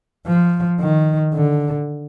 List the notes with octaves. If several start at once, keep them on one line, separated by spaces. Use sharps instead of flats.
F3
D#3
D3